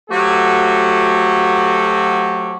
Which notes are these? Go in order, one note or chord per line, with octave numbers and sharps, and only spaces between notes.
F#3 A3 F#4 G4 A4 C5